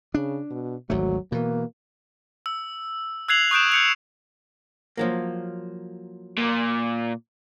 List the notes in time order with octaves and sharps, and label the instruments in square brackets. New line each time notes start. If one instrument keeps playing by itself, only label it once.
[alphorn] C#3 [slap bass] D4
[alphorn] B2
[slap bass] G#1 D2 A3 [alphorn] F#3
[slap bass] B2 E3 [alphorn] A#3
[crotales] E6
E6 F#6 G#6 C7 F7 F#7
C#6 D#6 F#6 G6 D7 E7
G6 C#7 F7
[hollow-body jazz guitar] F3 F#3 A#3
[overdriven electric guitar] A#2